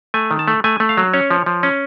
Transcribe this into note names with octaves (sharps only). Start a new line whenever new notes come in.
A3 G#5
D#3
A5
A3
A3 G#5
A3
F5
F#3
C#4 C#5
F3
F3
C#4